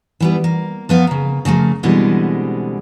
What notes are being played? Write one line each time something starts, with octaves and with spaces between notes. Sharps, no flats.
E3 G3 B3
A#3
F3 B3 F5
C#3 A#3
C#3 F3 A3 A#3
B2 D3 E3 G3 G#3 C4